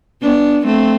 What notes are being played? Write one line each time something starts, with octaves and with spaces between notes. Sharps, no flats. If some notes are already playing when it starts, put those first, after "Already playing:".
B3 D4
A3 C4